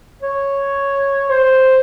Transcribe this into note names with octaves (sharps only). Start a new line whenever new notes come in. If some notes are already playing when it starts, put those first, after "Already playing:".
C#5
C5